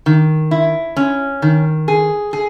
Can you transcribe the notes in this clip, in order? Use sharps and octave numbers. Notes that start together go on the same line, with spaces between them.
D#3
E4
C#4
D#3
G#4
G#4